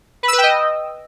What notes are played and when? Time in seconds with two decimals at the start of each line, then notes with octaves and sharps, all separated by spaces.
0.23 B4
0.28 E6
0.33 B4
0.38 G5
0.43 D#5